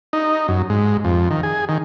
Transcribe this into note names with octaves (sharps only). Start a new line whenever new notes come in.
D#4
F#2
G#2
F2
D#3
G#4
D#3